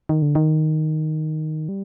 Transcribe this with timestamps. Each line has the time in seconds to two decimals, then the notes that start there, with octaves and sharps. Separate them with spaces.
0.09 D#3
0.22 D3
0.35 D#3
1.69 G3